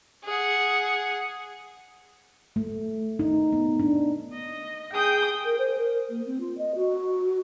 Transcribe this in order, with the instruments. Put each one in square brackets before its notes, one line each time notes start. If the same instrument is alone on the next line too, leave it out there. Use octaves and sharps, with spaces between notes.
[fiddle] G#4 F#5
[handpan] A3
D#4
B3
D4
[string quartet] D#5
G#4 G5 D#6 G6
[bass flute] A#4
C5
A#4
A#3
C4
F4
D#5
F#4